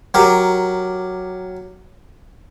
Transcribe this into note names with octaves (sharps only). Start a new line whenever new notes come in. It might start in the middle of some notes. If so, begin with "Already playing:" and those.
F#3 G4 A#4